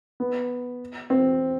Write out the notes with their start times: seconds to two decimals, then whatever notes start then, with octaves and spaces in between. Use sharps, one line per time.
0.20 B3
1.10 C4